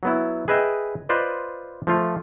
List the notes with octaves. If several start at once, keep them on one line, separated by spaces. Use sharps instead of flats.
F#3 B3 E4
G#4 B4 D#5 E5 G5
F4 B4 C5 D5 D#5
F3 A3 F4